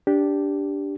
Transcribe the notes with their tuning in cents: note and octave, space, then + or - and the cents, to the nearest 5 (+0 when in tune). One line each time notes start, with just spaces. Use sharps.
D4 -10 G4 +0